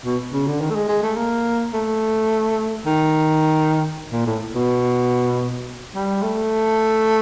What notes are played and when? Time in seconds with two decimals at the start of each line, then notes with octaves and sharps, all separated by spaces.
0.05 B2
0.33 C#3
0.47 D3
0.61 D#3
0.71 A3
0.75 G#3
0.89 G#3
1.03 A3
1.17 A#3
1.74 A3
2.86 D#3
4.12 A#2
4.27 A2
4.55 B2
5.95 G3
6.22 A3